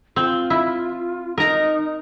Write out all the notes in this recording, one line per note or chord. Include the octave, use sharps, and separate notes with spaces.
C4 F4
E4
D#4 A#4 A#5